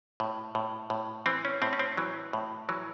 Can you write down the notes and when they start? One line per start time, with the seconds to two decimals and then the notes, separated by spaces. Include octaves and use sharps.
0.20 A2
0.55 A2
0.90 A2
1.26 E3 C4
1.45 C#4
1.62 A2 C4
1.73 C#4
1.79 C4
1.97 E3 F#3
2.33 A2
2.69 E3 F#3